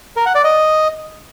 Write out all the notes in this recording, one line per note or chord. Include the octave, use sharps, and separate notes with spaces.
A#4
F#5
D5
D#5